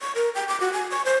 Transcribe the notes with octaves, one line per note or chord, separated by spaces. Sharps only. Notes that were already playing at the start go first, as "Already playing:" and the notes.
C#6
A#4
G5
D6
F#4
G#5
C#6
C5